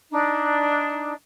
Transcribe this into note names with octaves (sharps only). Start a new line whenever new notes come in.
D4 D#4